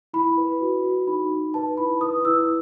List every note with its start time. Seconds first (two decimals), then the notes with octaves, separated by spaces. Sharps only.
0.14 E4 B5
0.37 B4
0.61 F#4
0.84 F#4
1.07 D#4 B5
1.31 D#4
1.54 B4 A5
1.77 E4 B5
2.01 B4 D#6
2.25 E4 E6